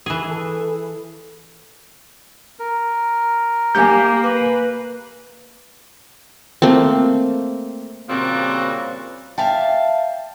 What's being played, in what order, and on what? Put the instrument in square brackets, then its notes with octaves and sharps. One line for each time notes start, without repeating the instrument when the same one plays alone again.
[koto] E3 G#4
[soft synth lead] A4
[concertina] A#4
[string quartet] A#3 [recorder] G4 [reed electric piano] G#5 G6
[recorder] B4
[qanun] A3 A#3 C4
[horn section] A#2 C#3 F3 G3 C4 F#4
[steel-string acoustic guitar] D5 E5 F5 [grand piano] G5 A5